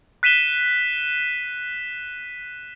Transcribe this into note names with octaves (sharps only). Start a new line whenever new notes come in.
F#6 B6 D#7 E7 G7